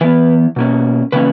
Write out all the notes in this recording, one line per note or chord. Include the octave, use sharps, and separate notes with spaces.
E3 B3 B4
B2 A#3 C#4
C#3 E3 A#3 C#4 B4